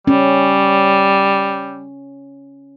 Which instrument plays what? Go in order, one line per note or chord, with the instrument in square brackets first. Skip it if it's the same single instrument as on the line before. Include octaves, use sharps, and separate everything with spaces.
[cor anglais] G3 [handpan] C#4